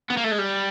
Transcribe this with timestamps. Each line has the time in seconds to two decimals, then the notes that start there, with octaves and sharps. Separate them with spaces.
0.10 B3
0.17 A#3
0.24 A3
0.32 G#3
0.39 G3